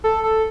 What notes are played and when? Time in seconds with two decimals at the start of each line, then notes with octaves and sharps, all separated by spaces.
0.04 A4
0.24 A4